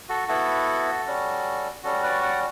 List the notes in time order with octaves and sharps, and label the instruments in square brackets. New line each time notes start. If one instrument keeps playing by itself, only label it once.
[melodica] F#4 A4
B3 E4 F#4 A4
G3 C#4 F#4
G3 C#4 F#4 A4
B4 D5
D5 F#5